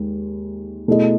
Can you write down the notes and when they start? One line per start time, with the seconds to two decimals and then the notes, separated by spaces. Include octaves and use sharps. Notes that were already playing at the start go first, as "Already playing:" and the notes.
Already playing: D#2 G#3
0.88 B2 A3 E4 G#4 D#5